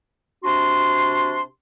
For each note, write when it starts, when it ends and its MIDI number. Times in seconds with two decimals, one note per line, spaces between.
0.44 1.41 48
0.44 1.41 62
0.44 1.41 66
0.44 1.41 84